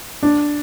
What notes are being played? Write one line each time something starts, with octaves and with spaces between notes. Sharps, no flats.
D4